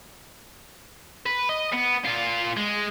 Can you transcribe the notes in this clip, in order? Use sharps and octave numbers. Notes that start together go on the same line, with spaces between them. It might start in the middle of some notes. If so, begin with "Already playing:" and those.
B4
D#5
B3
A#2 F4
G#3